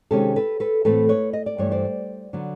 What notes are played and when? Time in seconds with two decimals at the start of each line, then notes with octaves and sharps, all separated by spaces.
0.11 C3 D#3 G#3 C#4 G4 A4
0.36 A4 B4
0.60 A4 B4
0.85 A2 E3 A3 C4 A4 B4
1.09 B4 C#5
1.33 D#5
1.46 D5
1.58 G2 E3 A3 C#5
1.71 C5 D5
2.33 D3 F#3 B3